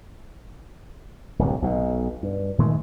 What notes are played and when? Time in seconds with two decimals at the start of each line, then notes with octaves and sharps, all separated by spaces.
1.39 D1 C2 G2
1.62 B1 B2
2.23 G2
2.58 A#2 D#3 G#3 A3